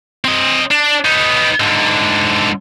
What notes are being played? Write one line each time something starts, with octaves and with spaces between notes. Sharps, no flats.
C4 D#5
D4
B3 D#4
G#2 D3